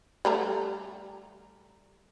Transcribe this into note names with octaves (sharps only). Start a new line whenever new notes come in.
G3 A3 A#5